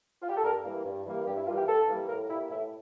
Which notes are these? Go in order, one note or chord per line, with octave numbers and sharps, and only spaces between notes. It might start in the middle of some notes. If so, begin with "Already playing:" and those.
F4
G4
A4
G2 A#4
E3 G3 A#3
G2
E3 G3 A#3
G2 G4
E4
E3 G3 A#3 F4
G4
G2 A4
E3 G3 A#3
A2 A#4
G3 A#3 E4
A2 E4